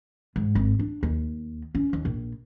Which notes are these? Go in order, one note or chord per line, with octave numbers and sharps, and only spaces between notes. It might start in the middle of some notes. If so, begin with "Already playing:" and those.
G#2
G#1
D4
D#2
C#4
D#2
A#1